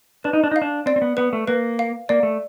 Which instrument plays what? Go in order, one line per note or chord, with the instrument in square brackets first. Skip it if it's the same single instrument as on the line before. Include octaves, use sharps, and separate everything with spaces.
[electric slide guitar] D4 [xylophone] B4
[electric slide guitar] D#4
D4
D#4
[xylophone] F5
[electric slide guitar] D4
[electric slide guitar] C4 [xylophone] D5
[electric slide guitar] C4
B3
[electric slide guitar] B3 [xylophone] B4
[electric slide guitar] A3
[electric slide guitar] A#3 [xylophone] B4
[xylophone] F5
[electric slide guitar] A#3 [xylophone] D5
[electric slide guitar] A3